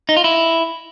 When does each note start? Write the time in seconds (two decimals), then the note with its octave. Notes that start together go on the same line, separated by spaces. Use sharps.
0.09 D#4
0.16 F4
0.24 E4